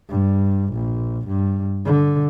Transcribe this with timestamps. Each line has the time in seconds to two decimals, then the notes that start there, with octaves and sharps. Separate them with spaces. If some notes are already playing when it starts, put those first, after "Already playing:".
0.10 G2
0.74 A#1
1.27 G2
1.86 D3